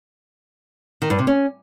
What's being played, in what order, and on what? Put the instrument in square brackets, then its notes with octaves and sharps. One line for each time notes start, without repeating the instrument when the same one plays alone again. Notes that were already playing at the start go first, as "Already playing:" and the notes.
[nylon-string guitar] D#3
G2
C3
C#4